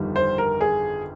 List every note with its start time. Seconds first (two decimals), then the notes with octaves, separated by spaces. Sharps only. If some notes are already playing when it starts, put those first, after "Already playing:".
Already playing: G1 F2 D#3 G3
0.16 C5
0.38 A#4
0.61 G#4